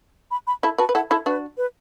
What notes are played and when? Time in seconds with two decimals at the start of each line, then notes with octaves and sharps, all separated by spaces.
0.31 B5
0.47 B5
0.63 E4 A4 B5
0.78 F#4 B4 A5
0.89 B4
0.95 E4 A4 F#5
1.10 E4 A4 B5
1.26 D4 F#4 B4
1.57 B4